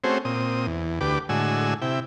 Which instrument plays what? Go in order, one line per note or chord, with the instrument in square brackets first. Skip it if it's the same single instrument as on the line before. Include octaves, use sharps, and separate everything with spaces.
[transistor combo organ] A3 C4 C#4 F#4 G#4 C5
A#2 C4 D#6
E2
D2 G4 B4 D6
A2 D3 G#3 F#4 G#5 E6
C3 E4 G5